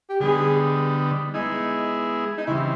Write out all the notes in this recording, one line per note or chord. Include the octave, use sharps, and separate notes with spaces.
G4
D3 G3 B3 D#4 G#4
G#3 B3 D#4 E4 G#4
D#4
C#3 E3 G3 C4 E4